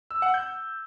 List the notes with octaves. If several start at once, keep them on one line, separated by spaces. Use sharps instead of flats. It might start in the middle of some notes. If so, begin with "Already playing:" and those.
E6
F#5
G6